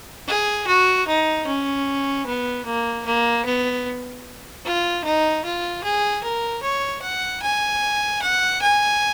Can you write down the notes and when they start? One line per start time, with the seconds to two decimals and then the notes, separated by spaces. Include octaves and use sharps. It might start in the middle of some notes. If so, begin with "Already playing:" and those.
0.28 G#4
0.67 F#4
1.08 D#4
1.47 C#4
2.26 B3
2.66 A#3
3.06 A#3
3.46 B3
4.65 F4
5.04 D#4
5.45 F4
5.84 G#4
6.23 A#4
6.63 C#5
7.02 F#5
7.42 G#5
8.22 F#5
8.62 G#5